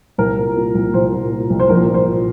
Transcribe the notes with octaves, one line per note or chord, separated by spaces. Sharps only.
C2 A#4
A#2
A#2
C2
C2 C5
A#2
A#2
C2
C5
A#1 A#4
A#2
C5
A#2